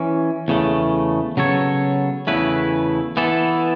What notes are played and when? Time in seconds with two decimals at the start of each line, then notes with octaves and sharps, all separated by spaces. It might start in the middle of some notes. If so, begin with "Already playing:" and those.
Already playing: E3 C#4
0.48 E2 C#3 A3
1.37 C#3 F#3 B3 A4 C#5
2.27 E2 C#3 A3 E4 B4
3.17 E3 B3 E4 A4